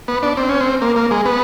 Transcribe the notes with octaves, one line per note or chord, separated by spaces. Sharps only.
B3
D4
C4
C#4
C4
A#3
A#3
G#3
B3